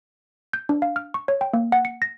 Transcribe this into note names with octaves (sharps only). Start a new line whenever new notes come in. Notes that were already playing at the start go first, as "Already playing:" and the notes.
G6
D4
F5
F6
C#6
C#5
G5
A#3
F#5
C#7
A#6